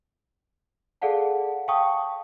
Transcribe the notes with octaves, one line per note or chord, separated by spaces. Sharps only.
G#4 A4 D5 F5 F#5 A5
F5 G5 A5 C#6 D#6